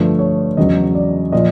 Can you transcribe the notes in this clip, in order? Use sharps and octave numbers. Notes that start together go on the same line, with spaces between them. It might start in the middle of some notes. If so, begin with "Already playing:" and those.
Already playing: G2 D3 F3 A3 B4
C#5
E2 C#3 F#3 D#5
D5
A#2 F3 D#5